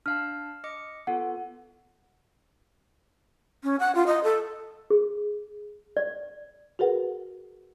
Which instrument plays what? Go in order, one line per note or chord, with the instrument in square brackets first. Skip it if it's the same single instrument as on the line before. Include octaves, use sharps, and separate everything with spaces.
[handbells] D4 F5 A5 [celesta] F6
[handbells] D#5 D6 C#7
[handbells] B3 F4 A4 [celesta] F#5
[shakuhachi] C#4
F#5
F4
D#5
A4
[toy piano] G#4
D5
[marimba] F#4 G#4 A#4 B4 F#5